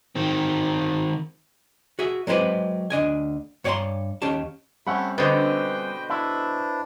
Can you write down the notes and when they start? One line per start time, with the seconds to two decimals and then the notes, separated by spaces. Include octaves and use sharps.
0.15 D#3 C4
1.99 F#4 G#4 E5
2.27 F#3 G#3 C4 F#4 B4 D5
2.90 D2 D4 D#5 G#5
3.64 G2 C#5 D5 G5 A#5 C6
4.22 D#2 C#4 G4 A5
4.87 G3 A3 C4 C#4 F#5 B5
5.18 B2 D3 B4 C5 D#5 G5
6.10 D4 E4